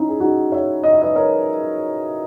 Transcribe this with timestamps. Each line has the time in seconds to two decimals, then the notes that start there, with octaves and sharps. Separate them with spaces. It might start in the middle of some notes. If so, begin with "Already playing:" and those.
Already playing: C#4 D#4 E4
0.09 G#4
0.20 D#4 F#4
0.52 C#5 E5
0.84 D#5
0.93 E5
1.02 B4 D#5
1.16 A#4 C#5